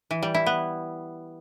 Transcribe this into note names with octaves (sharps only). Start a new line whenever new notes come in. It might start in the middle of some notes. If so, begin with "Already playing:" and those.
E3
G3
E4
B3